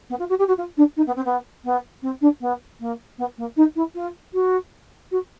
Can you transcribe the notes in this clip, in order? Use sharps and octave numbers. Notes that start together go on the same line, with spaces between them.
B3
F4
F#4
G4
F#4
F4
D4
D#4
B3
C4
B3
B3
C4
D4
B3
A#3
B3
A#3
D#4
E4
F4
F#4
F#4